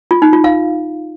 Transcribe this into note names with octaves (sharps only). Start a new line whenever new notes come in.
F4
D#4
F4
F5